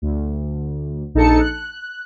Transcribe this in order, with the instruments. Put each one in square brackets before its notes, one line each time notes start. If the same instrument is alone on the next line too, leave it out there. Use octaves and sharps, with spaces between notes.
[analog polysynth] D2
A#1 D#4 A4 A5 C#7
F#6